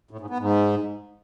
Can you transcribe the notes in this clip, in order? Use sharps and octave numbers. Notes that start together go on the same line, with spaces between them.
A2
G#2
B3
G#2